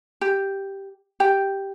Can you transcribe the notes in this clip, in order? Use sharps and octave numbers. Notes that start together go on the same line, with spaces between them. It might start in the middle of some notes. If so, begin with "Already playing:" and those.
G4
G4 G5